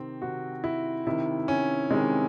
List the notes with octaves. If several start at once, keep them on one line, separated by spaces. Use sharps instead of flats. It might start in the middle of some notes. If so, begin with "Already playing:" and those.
Already playing: C3 D#3 C4
C3 D#3 F#4
E4
C3 D#3 E4
C#4
C3 D#3 G#3